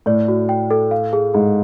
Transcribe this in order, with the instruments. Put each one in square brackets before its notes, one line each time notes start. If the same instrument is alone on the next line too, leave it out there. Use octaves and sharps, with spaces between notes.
[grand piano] A2 [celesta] D5
[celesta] F#4
G5
A4
F5
G#4
[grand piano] G#2 [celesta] G#4